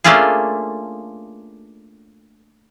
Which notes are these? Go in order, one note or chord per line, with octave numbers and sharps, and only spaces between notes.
A3 A#3 C#4 D4 F4 G#4